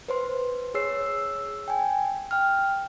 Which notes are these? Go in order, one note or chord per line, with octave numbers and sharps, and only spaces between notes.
B4 C5 C6
G#4 C#5 E6 C7
G5 G#5
G5 F6